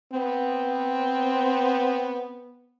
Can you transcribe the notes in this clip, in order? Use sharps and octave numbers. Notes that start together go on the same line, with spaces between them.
B3 C4